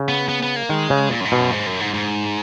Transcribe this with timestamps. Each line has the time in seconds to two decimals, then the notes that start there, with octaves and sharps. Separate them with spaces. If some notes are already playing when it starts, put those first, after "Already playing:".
Already playing: C#3
0.09 B3
0.29 B3
0.43 B3
0.56 A#3
0.69 D#3 G#3
0.90 C#3
1.11 A#2
1.21 F#2
1.25 G#2
1.32 B2
1.39 F#2
1.53 G#2
1.66 F#2
1.80 G#2
1.94 G#2